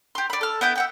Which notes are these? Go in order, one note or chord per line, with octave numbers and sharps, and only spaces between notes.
G4 C6
D5 B5
A4 F6
B3 E4 G5 G6
E5 F#5 G5